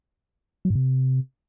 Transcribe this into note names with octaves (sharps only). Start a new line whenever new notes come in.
F#3
G#2
C3